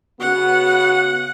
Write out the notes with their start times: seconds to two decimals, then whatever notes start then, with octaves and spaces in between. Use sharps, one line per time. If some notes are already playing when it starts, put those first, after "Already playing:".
0.20 C#3 B3 F#4 F#5